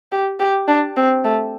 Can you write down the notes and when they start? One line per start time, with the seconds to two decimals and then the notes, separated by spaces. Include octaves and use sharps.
0.12 G4
0.40 G4
0.68 D4
0.97 C4
1.24 A3